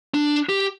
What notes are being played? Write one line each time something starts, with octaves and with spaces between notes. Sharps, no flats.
D4
G4